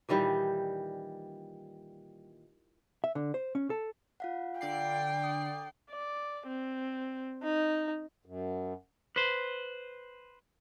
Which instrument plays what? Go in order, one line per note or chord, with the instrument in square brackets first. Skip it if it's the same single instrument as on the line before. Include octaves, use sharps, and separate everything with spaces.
[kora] A#2 D#3 E3 G3
[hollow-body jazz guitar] E5
D3
C5
C#4
A4
[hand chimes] F4 F5 F#5
[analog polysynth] D3 D5 C7 [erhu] G5
[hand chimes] D#6
[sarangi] D5
C4
D#4
[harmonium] F#2
[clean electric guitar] B4 C5